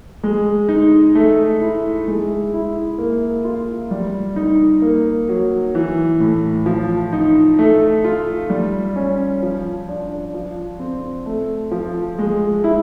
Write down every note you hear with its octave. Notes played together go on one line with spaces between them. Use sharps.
G#3
D#4
A3
E4
G#3
E4
A#3
F4
G3
D#4
A#3
F#3
E3
A2
F3
D#4
A3
F4
G3
C#4
F3
D4
F3
C4
A3
F3
G#3
E4